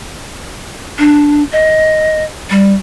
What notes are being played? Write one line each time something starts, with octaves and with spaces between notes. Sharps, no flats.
D4
D#5
G3